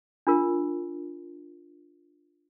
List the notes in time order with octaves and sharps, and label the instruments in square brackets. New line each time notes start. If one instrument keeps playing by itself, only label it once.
[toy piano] D4 F4 A#4